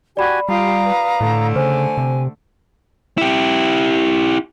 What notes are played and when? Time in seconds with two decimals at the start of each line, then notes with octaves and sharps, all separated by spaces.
0.17 F#4 G4 D5 G#5 B5
0.49 G3 F4 G4 F5 A#5 D#6
0.85 B4
1.21 A2 D3 A3
1.56 C#3 C5 G#5
1.98 C3
3.18 E4 G4